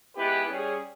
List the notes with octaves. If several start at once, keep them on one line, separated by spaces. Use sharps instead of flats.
G#3 B3 E4 G4 B4
G3 C#4 G#4